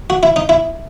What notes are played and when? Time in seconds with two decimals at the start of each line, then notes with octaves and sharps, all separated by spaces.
0.10 F#4
0.23 E4
0.36 D#4
0.49 E4